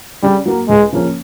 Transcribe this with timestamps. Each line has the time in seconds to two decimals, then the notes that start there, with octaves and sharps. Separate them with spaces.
0.23 C#3 G3
0.45 F#3 A#3
0.69 C#2 G#3
0.92 C#3 F3 A#3 C#4